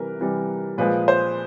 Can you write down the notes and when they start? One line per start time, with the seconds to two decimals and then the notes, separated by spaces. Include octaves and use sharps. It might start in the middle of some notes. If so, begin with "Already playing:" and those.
Already playing: C3 E3 G3 A#4 B4
0.19 C3 E3 G3
0.78 A#2 F3 G#3 B4
1.08 C5